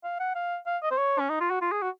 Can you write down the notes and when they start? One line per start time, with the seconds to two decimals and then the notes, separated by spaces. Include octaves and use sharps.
0.04 F5
0.20 F#5
0.35 F5
0.67 F5
0.83 D#5
0.91 C5
0.98 C#5
1.19 C#4
1.29 D#4
1.40 F4
1.50 F#4
1.62 F4
1.72 G#4
1.82 F#4